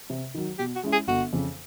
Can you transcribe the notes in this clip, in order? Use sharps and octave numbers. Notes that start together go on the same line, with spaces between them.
C3
D#3 F#3
B2 G4
F#4
G#3 C#4 E4
G#4
G1 F#4
F2 C#3